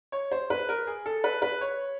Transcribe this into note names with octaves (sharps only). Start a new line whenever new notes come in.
C#5
C5
B4
A#4
G#4
A4
B4
B4
C#5